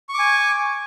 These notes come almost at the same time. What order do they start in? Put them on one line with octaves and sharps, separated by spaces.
C#6 D6 G#5